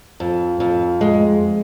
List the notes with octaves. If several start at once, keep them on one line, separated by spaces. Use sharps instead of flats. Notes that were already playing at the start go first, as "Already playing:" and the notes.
F2
F2
G#3